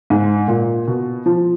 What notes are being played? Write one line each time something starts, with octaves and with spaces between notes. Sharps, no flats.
G#2
A#2
B2
F3